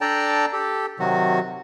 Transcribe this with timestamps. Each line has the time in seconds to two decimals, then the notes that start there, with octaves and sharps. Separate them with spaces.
0.01 D4 A4 D5 G5 A5 A#5
0.53 G4 A4
0.99 C3 D#3 F#3 F#4